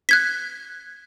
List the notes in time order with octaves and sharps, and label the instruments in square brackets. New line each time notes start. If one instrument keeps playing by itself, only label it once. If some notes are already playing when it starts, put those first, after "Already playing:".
[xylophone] F#6 G#6 B6